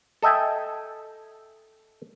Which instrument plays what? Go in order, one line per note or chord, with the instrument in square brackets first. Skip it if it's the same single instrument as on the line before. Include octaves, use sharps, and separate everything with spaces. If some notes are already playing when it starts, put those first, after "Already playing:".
[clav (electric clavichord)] A4 D#5 E5 G5 G#5